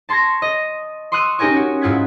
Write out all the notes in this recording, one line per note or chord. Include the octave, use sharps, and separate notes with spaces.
A5 C6 C#6 G#6 A#6
D#5
C6 C#6 D#6 E6 F#6 D#7
C#4 D#4 G4 A#4 G#5 C#6
F#4
G#2 E4 F4 F#5 G#6 B6